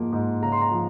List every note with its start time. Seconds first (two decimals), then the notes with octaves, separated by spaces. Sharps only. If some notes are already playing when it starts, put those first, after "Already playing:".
Already playing: G#2 F3 A#3
0.13 G#2
0.42 C#3 A#5
0.52 C6
0.62 A#5
0.71 F3